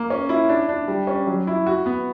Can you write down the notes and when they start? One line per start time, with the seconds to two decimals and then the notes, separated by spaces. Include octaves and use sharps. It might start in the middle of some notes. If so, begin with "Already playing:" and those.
Already playing: A#3
0.10 C#4
0.29 E4
0.49 D4
0.69 D4
0.88 G3
1.07 C#4
1.27 F#3
1.47 E4
1.67 F#4
1.86 B3